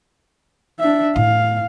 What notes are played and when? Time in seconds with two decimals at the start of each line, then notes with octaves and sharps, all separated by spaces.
0.79 D4 E5
1.16 A2 F5